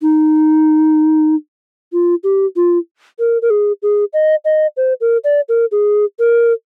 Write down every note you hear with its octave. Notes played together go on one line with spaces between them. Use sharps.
D#4
F4
G4
F4
A#4
A#4
G#4
G#4
D#5
D#5
C5
A#4
D5
A#4
G#4
A#4